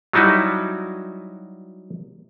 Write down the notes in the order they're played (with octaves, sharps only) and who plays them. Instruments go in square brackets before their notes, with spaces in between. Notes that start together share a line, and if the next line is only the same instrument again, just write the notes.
[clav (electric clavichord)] F#3 G3 D#4 E4 F#4